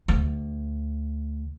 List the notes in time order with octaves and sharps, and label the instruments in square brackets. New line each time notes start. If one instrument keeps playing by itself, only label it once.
[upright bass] D2